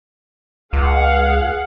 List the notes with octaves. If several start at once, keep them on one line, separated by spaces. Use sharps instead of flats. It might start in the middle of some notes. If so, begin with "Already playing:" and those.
C#2 G#4 F5 F#5